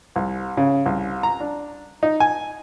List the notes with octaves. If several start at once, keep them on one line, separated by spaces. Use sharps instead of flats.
C2
C#3
C2
A#5
D4
D#4
G#5